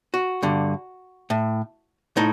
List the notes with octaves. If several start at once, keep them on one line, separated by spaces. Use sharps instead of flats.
F#4
G2 D3
A2
A2 D#4